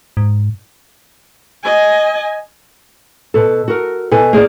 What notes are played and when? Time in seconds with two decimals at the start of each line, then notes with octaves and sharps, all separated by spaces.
0.17 G#2
1.64 D#5 G#5
3.34 B2 A4
3.68 F#4 A#4
4.11 B2 A4 G#5
4.33 A#3 G#4 C5 D5